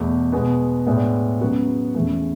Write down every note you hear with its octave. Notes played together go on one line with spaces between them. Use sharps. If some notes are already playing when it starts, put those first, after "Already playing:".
Already playing: E2 B2 A3
B2 G#3 B3
A2 G#3 B3 D4
C#3 F#3 B3 F#4
E2 C#3 E3 A3